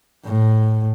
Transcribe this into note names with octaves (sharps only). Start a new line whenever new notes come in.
A2